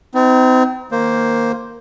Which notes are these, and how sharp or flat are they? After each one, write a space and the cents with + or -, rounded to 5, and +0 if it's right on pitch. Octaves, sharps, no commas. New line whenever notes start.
C4 -35 D#4 +25
D#3 +0 A#3 +0 C5 +0